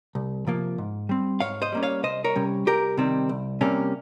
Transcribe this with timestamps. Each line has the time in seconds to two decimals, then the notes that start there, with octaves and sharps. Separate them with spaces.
0.15 C2
0.47 C3 F3 A#3
0.78 G#2
1.09 G3 C4
1.40 G#2 C#5 F5
1.62 C5 D#5
1.72 G3 A#3 C#4
1.83 C#5 F5
2.03 C2 C5 D#5
2.24 A#4 C#5
2.35 C3 G3 C#4
2.66 C2 G4 A#4
2.97 C3 D#3 G3 C4
3.29 C2
3.61 C3 G3 A#3 C#4